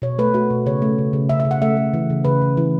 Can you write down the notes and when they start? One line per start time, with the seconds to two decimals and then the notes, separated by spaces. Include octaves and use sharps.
0.02 B2 C#5
0.18 A3 B4
0.34 A3 F#4
0.50 B2
0.66 C#3 C#5
0.82 A3
0.98 C#3
1.13 C#3
1.29 C#3 E5
1.40 E5
1.45 C#3
1.51 F#5
1.62 A3 E5
1.77 A3
1.94 E3
2.10 C#3
2.25 C#3 B4
2.42 C#3
2.57 E3